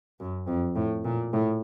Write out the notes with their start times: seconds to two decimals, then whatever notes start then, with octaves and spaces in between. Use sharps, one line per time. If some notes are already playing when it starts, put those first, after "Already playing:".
0.20 F#2
0.47 F2
0.76 A2
1.05 A#2
1.33 A2